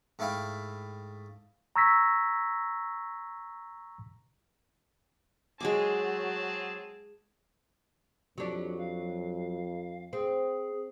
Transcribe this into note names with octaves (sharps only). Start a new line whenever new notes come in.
G#2 A3 E4 F5 G5 B5
A#5 C#6 E6 G#6 A#6 B6
F#3 G#3 C4 G#4 G#5 A5 D6
F2 F#3 D4 G4
F5
C4 G#4